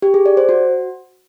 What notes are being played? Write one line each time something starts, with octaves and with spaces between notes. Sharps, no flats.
G4
G#4
D5
C5
F#4